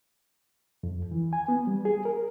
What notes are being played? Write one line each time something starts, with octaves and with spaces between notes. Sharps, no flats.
F2
E3
G#5
B3
G3
G#4
A#4